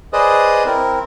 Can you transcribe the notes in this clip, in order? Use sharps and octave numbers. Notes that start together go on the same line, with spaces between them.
G#4 B4 C5 D5 D#5 D#6
C4 E4 A#4